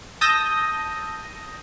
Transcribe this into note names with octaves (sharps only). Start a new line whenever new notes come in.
A5 D#6 E6 G6 A#6